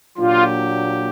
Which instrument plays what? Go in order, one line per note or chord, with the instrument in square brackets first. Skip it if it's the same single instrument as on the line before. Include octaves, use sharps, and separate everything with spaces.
[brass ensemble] A#2 F#3 A#3 D4 G4 [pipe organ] F4